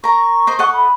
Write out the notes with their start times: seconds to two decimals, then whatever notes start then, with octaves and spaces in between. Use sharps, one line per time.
0.04 A#4 A#5 C#6
0.47 A#4 C5 D#5
0.59 A4 D#5 F#5
0.73 B5